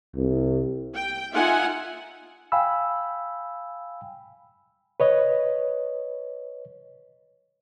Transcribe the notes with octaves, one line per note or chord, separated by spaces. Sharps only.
C2
G5
D#4 F4 E5 F#5 G#5
F5 G5 G#5 B5 E6
B4 C#5 D#5